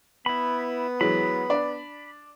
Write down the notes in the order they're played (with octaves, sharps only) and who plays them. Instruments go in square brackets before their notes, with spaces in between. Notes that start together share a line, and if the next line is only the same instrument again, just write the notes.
[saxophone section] B3 [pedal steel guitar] E4 B5
[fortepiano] E3 F#3 G#3 [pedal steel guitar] B5
[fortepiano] D4 D5